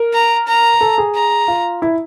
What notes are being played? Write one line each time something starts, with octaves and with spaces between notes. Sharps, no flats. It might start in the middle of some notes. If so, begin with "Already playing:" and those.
Already playing: A#4
A#5
A#5
A4
G#4
A#5
F4
E4